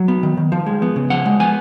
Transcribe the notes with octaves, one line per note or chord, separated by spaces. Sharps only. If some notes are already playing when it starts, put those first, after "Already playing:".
Already playing: F#3
B3
D#3
D#3
F3
G#3
B3
C#3
F3 F#5
G#3
B3 G#5